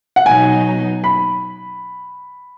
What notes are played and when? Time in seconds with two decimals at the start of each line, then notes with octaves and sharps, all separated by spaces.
0.16 F#5
0.26 B2 F#3 D#4 G#5
1.04 B5